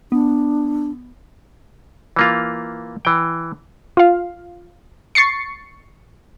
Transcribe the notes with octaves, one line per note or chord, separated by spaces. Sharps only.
B3 D4
E3 A#3 F4
E3 G5
F4 F5
C#6 A6 C7 C#7